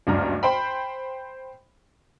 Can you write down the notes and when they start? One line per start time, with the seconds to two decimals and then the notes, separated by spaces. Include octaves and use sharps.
0.07 F#1 D2 G2 D4 A#5 F6
0.43 C5 G5 B5